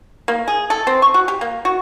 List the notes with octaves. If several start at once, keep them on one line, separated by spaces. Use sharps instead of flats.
A#3
G#4
A4
C4
C#6
F#4
G4
A#3
F#4